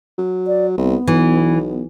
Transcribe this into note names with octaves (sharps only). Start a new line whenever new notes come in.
F#3
D5
C2 B3
B1 E3